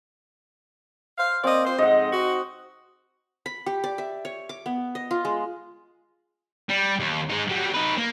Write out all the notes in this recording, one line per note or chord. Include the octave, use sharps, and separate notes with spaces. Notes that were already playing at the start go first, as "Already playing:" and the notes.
C5 F5
A#3 C4 D5 D#5
F4 C5
F2 G#2 D#5 F#5
D#4 F#4
B5
G4
D5
E5
C#5
D6
B3
D#5
F4
G#3
G3
D#2
G#3 D#4
F#3 G3
D#4 B4
A#3